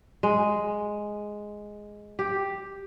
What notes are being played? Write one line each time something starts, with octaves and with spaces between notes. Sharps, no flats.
G#3
G4